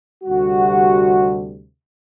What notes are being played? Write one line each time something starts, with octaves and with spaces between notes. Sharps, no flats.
D2 C3 G3 F#4